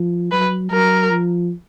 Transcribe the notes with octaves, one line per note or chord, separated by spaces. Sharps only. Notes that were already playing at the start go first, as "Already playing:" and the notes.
Already playing: F3
F#3 B4
F#3 A#4
F3